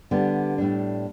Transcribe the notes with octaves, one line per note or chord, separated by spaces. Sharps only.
D3 G3 B3 G4
A2 G3 D4